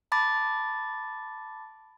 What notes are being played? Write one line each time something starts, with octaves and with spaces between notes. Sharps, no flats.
A5 B5 D6 A6